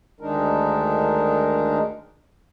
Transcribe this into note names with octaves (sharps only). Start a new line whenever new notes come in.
D2 D#3 G#3 D4 D#4 A#4